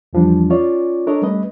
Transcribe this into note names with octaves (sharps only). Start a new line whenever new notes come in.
E2 E3 F3 G3 D4
C#4 F4 C#5 D5
D4 A4 A#4 C#5 D#5
G3 A3 C#4 B4 D#5